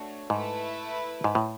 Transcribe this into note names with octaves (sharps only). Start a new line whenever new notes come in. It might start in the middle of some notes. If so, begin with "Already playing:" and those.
Already playing: A3 D4 F#4 C#5
G#2 A3 E4 B4
G#2
A2